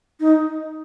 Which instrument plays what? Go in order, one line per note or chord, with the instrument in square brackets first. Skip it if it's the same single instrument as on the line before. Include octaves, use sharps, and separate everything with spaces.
[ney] D#4